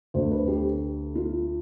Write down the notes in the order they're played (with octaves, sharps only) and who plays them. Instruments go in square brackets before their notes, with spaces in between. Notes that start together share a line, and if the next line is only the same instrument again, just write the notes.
[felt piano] D2 D3 C5
B4
G4
F4